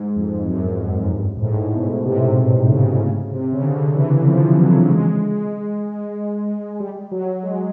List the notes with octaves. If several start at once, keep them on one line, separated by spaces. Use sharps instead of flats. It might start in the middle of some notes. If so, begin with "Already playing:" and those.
Already playing: G#2
F2
F#2
F#2
G2
G#2
A2
B2
C3
C3
C#3
C#3
C3
C#3
D3
E3
F3
F#3
G#3
G3
F#3
G#3